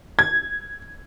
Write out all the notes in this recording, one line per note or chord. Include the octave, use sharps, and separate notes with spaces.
G#6